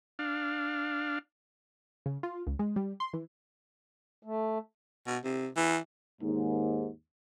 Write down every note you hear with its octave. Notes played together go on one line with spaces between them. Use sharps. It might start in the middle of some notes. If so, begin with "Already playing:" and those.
D4 F5
C#3
F4
C#2
G#3
G3
C6
E3
A3
B2
C3
E3
D#2 G#2